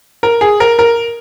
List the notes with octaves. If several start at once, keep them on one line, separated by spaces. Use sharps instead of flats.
A#4
G#4
A#4
A#4